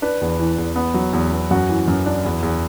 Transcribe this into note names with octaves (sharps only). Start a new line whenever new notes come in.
D4 B4
E2
E3
E2
B3
F#3
E2
B3
F#2 F#4
E3
F#2
D4
E2
E2